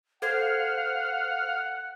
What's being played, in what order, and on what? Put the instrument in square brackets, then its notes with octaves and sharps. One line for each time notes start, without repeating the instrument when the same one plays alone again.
[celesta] A4 G#6 [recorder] C5 [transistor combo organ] F5 [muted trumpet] F#5